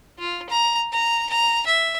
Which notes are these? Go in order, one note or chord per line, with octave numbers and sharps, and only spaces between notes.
F4
A#5
A#5
A#5
E5